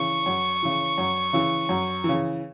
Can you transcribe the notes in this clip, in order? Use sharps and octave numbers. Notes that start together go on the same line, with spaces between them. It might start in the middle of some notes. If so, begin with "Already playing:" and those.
Already playing: C#3 E3 C#6
F#2
C#3 E3
F#2
C#3 E3
F#2
E3
C#3